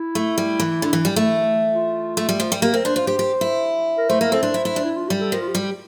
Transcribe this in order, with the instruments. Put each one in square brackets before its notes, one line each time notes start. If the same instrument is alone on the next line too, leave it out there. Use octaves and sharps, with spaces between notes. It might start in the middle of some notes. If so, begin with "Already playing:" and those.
Already playing: [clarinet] E4
[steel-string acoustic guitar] A3
G3
E3
D3
E3
G3
A3
[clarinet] F4
[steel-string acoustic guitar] A3
G3
F3
G3
[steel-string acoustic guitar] A#3 [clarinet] G4
[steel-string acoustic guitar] C4 [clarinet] A#4
[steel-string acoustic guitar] D4 [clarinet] C5
[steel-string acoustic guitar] F4 [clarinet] C5
[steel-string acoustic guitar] G4 [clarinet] C5
[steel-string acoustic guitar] G4
E4
[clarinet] A#4
[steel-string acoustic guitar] A3 [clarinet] C5
[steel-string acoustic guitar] A#3 [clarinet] A#4
[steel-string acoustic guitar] C4 [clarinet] A4
[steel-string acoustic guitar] D4 [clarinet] C5
[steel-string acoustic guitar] E4
E4
D4
[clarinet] E4
F4
[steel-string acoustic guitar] G3 [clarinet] G4
[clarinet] A4
[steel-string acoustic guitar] F3 [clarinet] A#4
[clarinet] F4
G4
[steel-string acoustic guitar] G3
[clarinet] G4